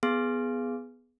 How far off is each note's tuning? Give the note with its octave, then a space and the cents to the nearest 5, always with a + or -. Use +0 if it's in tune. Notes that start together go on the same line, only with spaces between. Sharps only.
B3 +0 G#4 +0